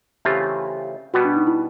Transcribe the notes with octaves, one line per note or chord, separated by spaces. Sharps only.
C#3 E3 A3 C4 F4 G4
B2 G3 B3 F#4
D4
D#4
E4